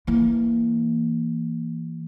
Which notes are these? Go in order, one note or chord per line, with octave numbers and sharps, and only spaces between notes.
E3 A#3